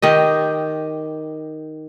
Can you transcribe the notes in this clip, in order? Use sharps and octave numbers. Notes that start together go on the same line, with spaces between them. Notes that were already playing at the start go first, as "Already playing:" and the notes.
D#3 G4 D#5